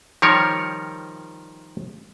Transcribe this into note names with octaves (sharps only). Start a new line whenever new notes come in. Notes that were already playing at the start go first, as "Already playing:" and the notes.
D#3 F3 G3 A#4 C#5